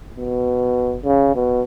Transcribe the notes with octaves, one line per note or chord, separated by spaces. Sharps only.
B2
C#3
B2